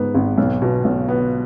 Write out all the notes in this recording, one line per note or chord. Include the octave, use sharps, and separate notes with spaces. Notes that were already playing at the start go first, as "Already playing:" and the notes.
Already playing: G#2 B3
G#1
B1
B2
B1
B3